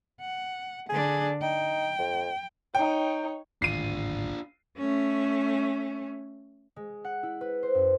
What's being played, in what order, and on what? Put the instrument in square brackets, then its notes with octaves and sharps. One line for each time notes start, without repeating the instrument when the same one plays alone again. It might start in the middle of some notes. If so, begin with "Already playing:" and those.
[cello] F#5
[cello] D3 D4 [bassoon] G#4
[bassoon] D#4 [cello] G5
[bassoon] F2
[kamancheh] D#4 C#5 [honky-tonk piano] G5
[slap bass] D1 G#1 [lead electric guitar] D4 F4 [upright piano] C7 D#7
[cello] A3 C#4
[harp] G#3
F#5
E4
B4
C5
F#2